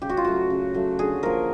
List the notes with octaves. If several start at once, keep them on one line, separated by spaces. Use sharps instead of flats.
C#3 G4
F#4
F4
F#3 A3 F#4
C#3
F#3 A3
D3 G#4
F3 A#3 A#4